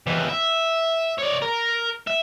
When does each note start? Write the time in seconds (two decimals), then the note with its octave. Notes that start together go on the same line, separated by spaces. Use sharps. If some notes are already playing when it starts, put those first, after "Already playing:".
0.07 D#2 E3
0.29 E5
1.19 C#5 D5
1.42 A#4
2.07 E5